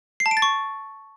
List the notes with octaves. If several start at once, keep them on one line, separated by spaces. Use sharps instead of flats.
C7
A5
D7
A6
C#6